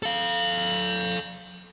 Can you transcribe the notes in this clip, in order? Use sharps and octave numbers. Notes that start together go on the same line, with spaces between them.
A4 F5